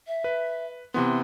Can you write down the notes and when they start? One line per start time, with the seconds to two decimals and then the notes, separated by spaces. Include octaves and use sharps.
0.07 E5
0.24 B4
0.94 C3 E3 B3 C6